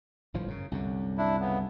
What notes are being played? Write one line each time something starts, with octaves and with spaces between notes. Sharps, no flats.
G1 A2 F3
F#2 C#3
C2 F#2 D3
D4 E4
C#3 B3